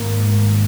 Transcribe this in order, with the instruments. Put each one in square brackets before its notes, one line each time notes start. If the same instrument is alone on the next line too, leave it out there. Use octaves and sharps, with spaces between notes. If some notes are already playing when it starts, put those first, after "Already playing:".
Already playing: [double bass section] G#1 G#2 A#3